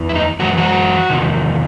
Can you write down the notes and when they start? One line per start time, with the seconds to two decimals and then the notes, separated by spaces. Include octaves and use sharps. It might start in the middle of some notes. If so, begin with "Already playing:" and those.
Already playing: E2 E3
0.09 E4
0.15 D#4
0.39 F#2 E3 F#4
0.58 F#4
1.10 E2 C3 D#3